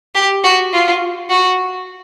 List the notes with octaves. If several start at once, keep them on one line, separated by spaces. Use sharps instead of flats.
G4
F#4
F4
F#4